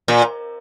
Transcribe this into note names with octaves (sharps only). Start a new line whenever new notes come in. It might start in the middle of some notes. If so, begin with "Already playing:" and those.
A#2